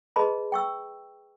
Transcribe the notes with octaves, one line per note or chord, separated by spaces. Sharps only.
G#4 B4 D#5 A5 B5 C6
G5 C#6 E6